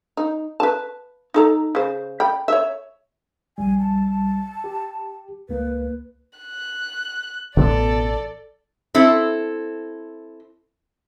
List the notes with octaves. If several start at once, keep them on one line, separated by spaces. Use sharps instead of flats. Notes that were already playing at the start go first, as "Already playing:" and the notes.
D#4
B4 A5
D#4 A4 A#5
C#3 C5
G5 B5
C#5 E5
A#1 G3 G#5
A5
G4
C#2 A#3 B4
F#6
A1 B2 B3 C#4 A4 D5
C4 E4 A4